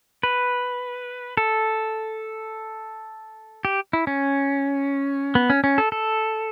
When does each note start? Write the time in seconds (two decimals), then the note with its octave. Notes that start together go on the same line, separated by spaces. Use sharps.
0.23 B4
1.37 A4
3.65 G4
3.93 E4
4.07 C#4
5.35 B3
5.50 C#4
5.64 C#4
5.78 A4
5.92 A4